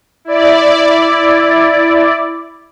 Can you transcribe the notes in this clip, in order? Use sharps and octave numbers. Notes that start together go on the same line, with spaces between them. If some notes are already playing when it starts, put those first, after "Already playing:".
E4 D5